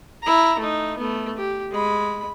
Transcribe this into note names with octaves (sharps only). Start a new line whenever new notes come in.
E4 A#5
A3 D#4
A3 B3
G4
G#3 B5